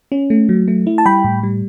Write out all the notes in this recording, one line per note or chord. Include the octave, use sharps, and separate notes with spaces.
C#4
A3
F#3
A3
E4
A5
G3 G5 B5
A2
G3